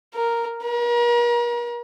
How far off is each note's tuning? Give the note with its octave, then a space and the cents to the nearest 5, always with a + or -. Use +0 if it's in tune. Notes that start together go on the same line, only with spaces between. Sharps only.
A#4 +0
A#4 +40